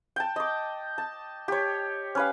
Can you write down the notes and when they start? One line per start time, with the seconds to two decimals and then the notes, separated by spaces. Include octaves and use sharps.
0.16 G5 A5
0.36 D#5 D6
0.98 A5
1.48 G4 C#5
2.15 C#4 B4 F5